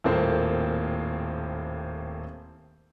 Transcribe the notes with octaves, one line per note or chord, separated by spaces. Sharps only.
D#1 A2 A#3 C4 C5